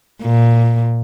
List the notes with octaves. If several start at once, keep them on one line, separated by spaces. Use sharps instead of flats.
A#2